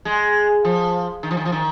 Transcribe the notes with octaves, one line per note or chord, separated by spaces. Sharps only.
G#3
F3
D#3
F3
D#3
F3
D#3